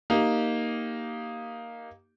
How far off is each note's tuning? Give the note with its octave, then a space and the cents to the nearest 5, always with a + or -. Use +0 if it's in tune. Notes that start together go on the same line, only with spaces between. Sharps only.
A#3 +0 D#4 +0 G4 -10